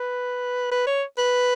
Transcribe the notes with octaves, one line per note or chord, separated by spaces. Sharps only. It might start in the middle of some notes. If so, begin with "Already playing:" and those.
Already playing: B4
B4
C#5
B4